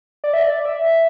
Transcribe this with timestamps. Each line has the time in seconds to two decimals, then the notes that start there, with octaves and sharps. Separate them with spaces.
0.24 D5
0.34 E5
0.43 D5
0.65 E5